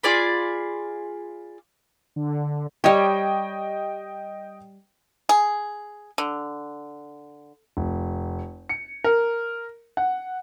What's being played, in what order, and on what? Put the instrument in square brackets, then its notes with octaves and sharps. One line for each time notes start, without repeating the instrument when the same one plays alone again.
[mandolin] F4 G#4 D5 B5
[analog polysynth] D3
[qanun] G3 C#5 [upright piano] D#5 G5
[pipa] G#4
D3
[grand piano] F1
C#7
A#4
F#5